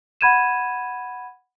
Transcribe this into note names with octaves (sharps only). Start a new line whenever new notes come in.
F#5 B5 G#6 D#7 E7